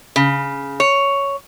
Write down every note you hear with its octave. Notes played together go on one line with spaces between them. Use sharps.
C#3
C#5